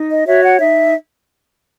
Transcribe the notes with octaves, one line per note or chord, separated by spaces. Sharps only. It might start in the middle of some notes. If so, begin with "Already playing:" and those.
Already playing: D#4
D#5
F#4 C#5 E5
F#5
D#4 E5